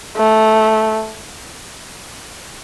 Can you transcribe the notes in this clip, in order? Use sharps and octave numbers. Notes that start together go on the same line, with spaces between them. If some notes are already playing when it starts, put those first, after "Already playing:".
A3